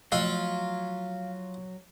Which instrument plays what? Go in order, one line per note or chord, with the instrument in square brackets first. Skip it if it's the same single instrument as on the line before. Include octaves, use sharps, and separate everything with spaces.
[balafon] F3 A3 D#5 [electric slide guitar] F#3 [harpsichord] F4 [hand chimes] F5